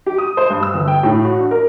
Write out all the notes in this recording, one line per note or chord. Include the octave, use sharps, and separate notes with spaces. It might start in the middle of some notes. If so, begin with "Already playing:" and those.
G4
D#6
C5
G2
E6
G1
G5
A2
F#4
D4
A#4